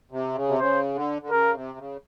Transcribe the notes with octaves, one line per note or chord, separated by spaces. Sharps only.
C3
C#3
C3
C#3 C5
D3
D3
C#3 A#4
C3
C#3